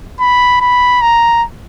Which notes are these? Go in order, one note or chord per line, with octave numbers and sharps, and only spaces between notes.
B5
B5
A#5